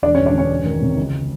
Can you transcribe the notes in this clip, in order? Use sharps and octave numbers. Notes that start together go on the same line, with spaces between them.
E1 D4 D5
C#4 C#5
E1
D4 D5
D3 C#4 C#5
G1
D#3
C3
C#2